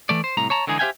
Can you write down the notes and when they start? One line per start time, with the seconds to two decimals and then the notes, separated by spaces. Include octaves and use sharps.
0.09 E3 A3 D5
0.24 C5
0.37 C2 A2 A#5
0.50 C#5 A5 A#5
0.67 D3 E3 G#3 D#4 G#4
0.79 G4 C5 E5 F5 G5 G#5